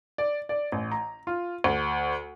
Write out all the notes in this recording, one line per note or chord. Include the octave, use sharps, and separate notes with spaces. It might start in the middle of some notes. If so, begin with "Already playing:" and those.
D5
D5
A1
A#5
F4
D2